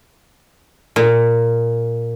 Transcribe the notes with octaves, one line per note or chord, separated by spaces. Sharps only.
A#2